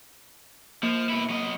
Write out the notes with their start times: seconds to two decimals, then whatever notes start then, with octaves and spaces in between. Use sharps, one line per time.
0.83 F3 A#3
1.09 B2 E4
1.30 F#3 D#5